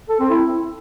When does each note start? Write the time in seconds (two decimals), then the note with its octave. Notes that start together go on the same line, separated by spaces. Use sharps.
0.09 A4
0.20 C4
0.30 E4